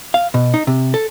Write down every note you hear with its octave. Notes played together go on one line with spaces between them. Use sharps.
F5
B2
D#4
C3
A4